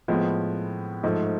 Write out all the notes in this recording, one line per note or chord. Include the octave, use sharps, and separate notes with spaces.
A2 F3 G#3 B3
G#2 F3 A3